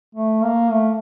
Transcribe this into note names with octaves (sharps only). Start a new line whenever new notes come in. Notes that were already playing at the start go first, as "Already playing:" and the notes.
A3
A#3
A3